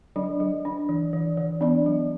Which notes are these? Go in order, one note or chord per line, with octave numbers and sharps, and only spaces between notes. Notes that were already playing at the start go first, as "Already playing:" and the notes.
F#3 D4 D5
F#3
D4
E3
E3
E3
B3 D4 D5
F#3